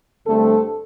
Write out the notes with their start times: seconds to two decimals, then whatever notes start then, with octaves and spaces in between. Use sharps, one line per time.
0.26 G2 D3 A3 C4 A4